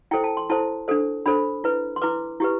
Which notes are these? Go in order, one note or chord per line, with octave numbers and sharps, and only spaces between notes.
E4 A4 C5 G5
A5
C6
E4 A4 C5 A5
D4 A4 C5
D4 A4 C5 B5
E4 B4
C6
E4 B4 D6
E4 G4 B4